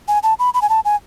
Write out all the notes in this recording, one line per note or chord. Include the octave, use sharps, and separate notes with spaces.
G#5
A5
B5
B5
G#5
A5
G#5